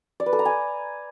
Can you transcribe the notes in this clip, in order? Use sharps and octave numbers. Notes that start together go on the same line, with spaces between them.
D5
B4
A4
A#5
G#5